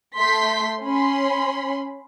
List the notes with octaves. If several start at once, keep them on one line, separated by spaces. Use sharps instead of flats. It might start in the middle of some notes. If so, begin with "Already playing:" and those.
A3 C6 G6 B6
C#4 B5 C6